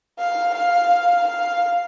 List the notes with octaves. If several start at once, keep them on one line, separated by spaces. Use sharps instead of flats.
F5
F5
F5